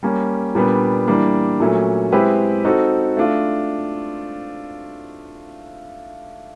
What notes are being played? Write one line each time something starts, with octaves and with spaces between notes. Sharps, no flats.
G3 A#3 C#4
A#2 G3 B3 D4
E3 G3 A#3 D4
A#2 F#3 A3 C#4
G#3 C4 E4 G4 B4
C4 D#4 F#4 A4
A3 D4 F4